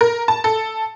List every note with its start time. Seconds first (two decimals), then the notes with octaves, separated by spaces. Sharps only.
0.01 A#4
0.28 A5
0.44 A4